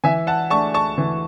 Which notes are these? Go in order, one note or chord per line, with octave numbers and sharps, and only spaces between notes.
E3 E5 G#5
F#5 A5
A3 D4 A5 C#6
A5 C#6
E3